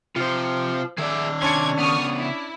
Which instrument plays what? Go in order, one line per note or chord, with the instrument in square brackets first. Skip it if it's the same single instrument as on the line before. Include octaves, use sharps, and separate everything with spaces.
[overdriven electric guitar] C3 [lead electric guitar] F4 C5
[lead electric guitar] D#3 D5 [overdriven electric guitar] G#4 E5
[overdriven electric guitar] C3 C6 [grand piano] C#4 D4 C#7 [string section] G#6
[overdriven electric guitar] C#3 B3 [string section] C#6 D#6 F6
[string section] E4